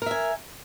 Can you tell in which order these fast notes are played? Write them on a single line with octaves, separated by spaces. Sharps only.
A#4 E5 G#5